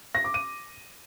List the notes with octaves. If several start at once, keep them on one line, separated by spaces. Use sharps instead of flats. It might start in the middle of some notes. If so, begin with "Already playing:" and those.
A#6
D6
D#7